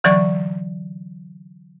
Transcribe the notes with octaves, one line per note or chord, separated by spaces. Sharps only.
D3 E3 F#3 D5 C#6 G#6